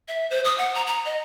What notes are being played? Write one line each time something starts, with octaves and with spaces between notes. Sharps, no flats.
E5
C5
D#6
F#5
A#5
A#5
D#5